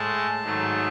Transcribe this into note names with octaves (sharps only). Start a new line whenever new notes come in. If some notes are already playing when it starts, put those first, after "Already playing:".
Already playing: A2 G#3 A5
G#2 D#3 F#3 A3